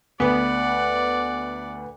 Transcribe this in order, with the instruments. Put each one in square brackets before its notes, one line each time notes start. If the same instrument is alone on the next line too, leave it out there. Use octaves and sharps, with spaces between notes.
[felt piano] D2 B4 [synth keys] B3 [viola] D5 F#5